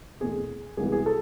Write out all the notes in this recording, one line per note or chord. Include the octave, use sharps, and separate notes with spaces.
E2 B2 A3 C4 G#4
C2 C3 E3 G#3 B3 G#4
G#4
A4